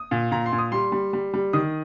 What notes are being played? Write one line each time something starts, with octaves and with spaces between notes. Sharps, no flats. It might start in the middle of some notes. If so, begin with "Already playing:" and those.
Already playing: D#6
A#2
A#2 A#5
C6
A#2
D#6
G3 C6
G3
G3
G3
D#3 D#6